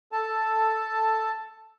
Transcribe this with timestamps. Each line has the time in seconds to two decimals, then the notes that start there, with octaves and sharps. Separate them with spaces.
0.12 A4 A5